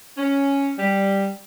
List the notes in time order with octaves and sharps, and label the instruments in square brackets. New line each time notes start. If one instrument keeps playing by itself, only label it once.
[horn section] C#4
G3